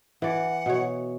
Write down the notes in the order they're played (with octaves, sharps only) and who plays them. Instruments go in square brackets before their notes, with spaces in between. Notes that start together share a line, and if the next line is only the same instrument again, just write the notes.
[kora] E3 D5 [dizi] F#5
[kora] B2 C#5